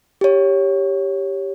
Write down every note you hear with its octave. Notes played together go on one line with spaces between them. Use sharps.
G4 C#5